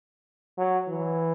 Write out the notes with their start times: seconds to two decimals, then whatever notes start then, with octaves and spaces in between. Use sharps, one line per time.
0.57 F#3
0.88 E3